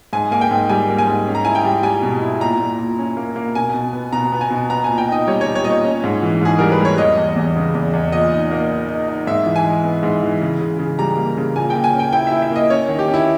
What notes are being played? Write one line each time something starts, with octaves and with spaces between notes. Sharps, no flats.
G#2 G#5
A#3 G#5
G5
G#2
G3 G#5
A#3
G#5
G#2
C#4
A#5
E4 G#5
G5
G3
G3 G#5
B2
E4
A#2 A#5
A#2
A#2
C#4
A#3
A#3
B2 G#5
B2
B3
B2 A#5
B3
G#5
B2
B3 A#5
A#2 G#5
G5
D#4 D#5
G3 C#5
C#5
G3
C#5
A#2 D#5
C#5
C#4
G#2
E3
G#2 G#4
G3 A#4
B4
G3
C#5
E2 D#5
E2
E2
C#3
E2
E2
A#2 D#5
D#4
A#3
D#4
D#4
D#4
G#2 E5
E3
G#5
G#3
B3
G#2
E3
C#3
C#3
C#3
G3 A#5
A#3
C#3
A#2 G#5
A#3 G5
G#5
C#4 G5
E4 G5
E4 E5
E5
A#3 D#5
C#4 C#5
D#3
G4
C#4
E4